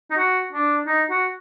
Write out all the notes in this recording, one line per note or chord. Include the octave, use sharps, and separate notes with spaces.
D#4
F#4
D4
D#4
F#4